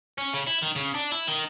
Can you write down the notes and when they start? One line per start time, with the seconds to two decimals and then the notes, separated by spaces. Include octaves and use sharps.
0.18 C#4
0.33 C#3
0.47 E4
0.62 D#3
0.76 C#3
0.95 D4
1.12 E4
1.28 D#3